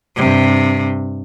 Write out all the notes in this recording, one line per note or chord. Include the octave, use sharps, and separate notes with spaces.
G2 C3